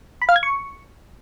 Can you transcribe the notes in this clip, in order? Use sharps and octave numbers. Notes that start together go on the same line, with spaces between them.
B5
F5
G#6
C#6